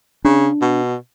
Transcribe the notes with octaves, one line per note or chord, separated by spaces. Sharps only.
C#3 D4
B2